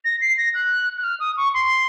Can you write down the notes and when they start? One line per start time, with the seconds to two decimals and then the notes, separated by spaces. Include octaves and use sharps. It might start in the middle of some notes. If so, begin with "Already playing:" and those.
0.05 A#6
0.21 C7
0.38 A#6
0.54 F#6
0.97 F#6
1.04 F6
1.20 D#6
1.37 C#6
1.54 C6